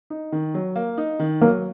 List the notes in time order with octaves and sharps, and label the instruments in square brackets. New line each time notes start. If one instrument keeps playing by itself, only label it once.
[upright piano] D#4
D#3
F#3
A#3
D#4
D#3
[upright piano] F#3 [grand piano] A#3